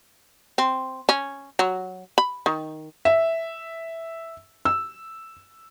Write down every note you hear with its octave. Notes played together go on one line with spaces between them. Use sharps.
C4
C#4
F#3
B5
D#3
E5
E6